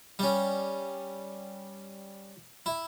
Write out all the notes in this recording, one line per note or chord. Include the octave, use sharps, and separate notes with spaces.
G3 C#4
E4